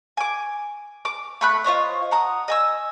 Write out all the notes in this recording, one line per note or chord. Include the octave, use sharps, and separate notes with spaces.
G#5 D6
D6
A3 B5 F#6
F4 C5 C#5 D#5
F#5 A#5 D#6
D#5 G#5 E6